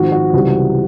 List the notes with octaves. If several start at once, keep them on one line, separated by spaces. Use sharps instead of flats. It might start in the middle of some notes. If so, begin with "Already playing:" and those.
Already playing: G#1 G#2 F3 F#4
F#4
C#2 C3 E3 G3